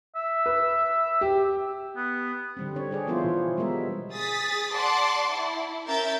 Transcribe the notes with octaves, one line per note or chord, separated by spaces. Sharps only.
E5
B4
G4
B3
D3 G3 C4
D4 C#5
D4 G#4 D5
F3 B3 E4 F4 C5 C#5
B2 E3
G3 G#3 B3 A#4 E5
G#4 D#6 A6 B6
D5 F#5 A5 C6 D6
E4
C#4 A#4 E5 G6 A6